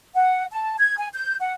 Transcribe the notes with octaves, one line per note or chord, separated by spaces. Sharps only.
F#5
A5
G#6
G#5
G6
F#5